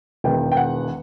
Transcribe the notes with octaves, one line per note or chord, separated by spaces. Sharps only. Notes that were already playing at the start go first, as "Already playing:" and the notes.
E1 E2 D#3 G5
G5
F#5